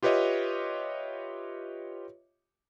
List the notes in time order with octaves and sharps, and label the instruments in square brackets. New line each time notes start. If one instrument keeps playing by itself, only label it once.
[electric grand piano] F4 G4 B4 C#5 D#5 E5